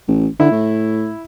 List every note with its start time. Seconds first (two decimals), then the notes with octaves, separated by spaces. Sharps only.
0.08 A1
0.40 D3 E4
0.52 A2